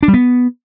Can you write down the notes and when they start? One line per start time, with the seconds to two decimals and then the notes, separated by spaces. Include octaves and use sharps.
0.03 D4
0.08 G3
0.14 B3